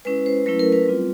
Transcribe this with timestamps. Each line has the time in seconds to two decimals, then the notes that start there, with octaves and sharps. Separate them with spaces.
0.05 G#3 C#4 E4 B4
0.26 C5
0.46 F#3 A3 C#4 E4 B4
0.59 A#4
0.72 B4
0.86 G3 C4 F4